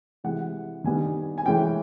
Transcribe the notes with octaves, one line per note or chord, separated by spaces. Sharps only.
C3 E3 G#3 F#5
D#3 G3 B3 D4 G#5
G#5
E3 G#3 C#4 G5